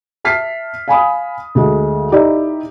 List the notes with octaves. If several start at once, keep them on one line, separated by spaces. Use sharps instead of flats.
E5 A5 F6 B6 C7
F5 G#5 B5 D#6
D2 G#3
D#4 E4 G4 D5 D#5